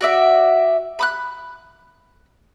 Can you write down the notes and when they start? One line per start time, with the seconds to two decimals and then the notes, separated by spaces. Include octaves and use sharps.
0.01 F#4 D5 E5
0.99 B5 D6 F#6